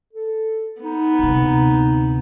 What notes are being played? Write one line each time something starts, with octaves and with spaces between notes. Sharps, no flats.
A4
B3 D#4
D2 C3